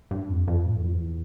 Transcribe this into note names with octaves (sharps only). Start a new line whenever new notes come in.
G2
F2
F2
A2
E2
F2
E2